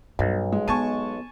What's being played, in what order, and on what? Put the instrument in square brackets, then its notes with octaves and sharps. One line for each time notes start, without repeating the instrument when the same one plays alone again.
[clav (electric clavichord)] B1 [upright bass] G2
[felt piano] G#3
[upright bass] B3 [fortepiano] G#5 A5 C#6